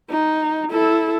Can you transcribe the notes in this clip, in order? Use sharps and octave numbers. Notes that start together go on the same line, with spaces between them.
D#4
E4 A4